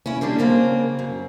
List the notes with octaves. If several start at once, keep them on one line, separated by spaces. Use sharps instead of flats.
C#4 E4
D3 G3 A#3 D4
C#3 A#3 C4
F#2